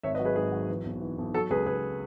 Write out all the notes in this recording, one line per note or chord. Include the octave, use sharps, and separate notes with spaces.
G#1 C#5 E5
B4 D#5
F#3
G#4 B4
G#2 G#4 B4
F#3
E3
B1
E3
B1
F#3 A4
C#2 G#4 B4
C#2 G#4 B4